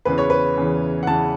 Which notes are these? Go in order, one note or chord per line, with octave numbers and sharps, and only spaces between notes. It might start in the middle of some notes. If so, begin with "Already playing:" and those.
E2 C#3 E3 B4
C#5
B4
E2 C#3 E3
F#5
E2 C#3 E3 A5